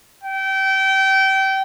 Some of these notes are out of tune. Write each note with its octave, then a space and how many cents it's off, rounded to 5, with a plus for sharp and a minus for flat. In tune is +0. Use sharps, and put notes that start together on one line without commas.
G5 -25